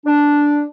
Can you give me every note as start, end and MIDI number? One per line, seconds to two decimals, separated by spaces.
0.06 0.64 62